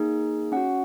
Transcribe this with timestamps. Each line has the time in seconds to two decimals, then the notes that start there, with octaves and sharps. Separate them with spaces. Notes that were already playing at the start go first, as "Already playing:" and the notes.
Already playing: A#3 D#4 G#4
0.52 C#4 F#4 F#5